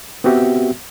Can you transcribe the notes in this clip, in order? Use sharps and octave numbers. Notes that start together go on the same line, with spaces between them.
B3 C4 F#4 G4 E5